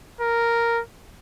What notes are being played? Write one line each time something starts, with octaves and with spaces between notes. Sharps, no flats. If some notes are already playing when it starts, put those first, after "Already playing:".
A#4